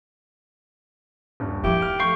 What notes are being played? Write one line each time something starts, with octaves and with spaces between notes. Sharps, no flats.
D#1 G2
D#3 F3 E4 G4
F6
A3 F5 C#6 G6